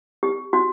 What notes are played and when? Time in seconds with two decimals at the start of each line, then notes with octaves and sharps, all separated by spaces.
0.23 G4
0.53 F#4